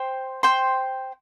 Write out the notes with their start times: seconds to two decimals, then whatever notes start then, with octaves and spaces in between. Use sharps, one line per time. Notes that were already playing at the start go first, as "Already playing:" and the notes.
Already playing: C5 G5 C6
0.43 C5 G5 C6